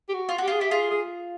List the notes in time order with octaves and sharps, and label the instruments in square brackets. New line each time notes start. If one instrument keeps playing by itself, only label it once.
[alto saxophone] G4
F#4
[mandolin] F4
F#4
[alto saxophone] G4
[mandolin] F4 [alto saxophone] G#4
[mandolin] E4 [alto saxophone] G4
[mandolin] F4 [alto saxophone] G#4
[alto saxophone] G#4